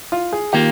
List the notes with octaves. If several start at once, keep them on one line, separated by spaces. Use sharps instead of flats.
F4
G#4
D#3 A#3 F4 G4